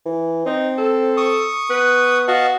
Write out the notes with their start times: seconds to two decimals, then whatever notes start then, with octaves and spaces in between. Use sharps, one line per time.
0.05 E3
0.46 C4 D#4
0.78 A4
1.17 C#6 D#6
1.70 B3 B4
2.28 F#4 D#5 F5 A5